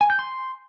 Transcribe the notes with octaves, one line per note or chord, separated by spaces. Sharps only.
G#5
G6
C6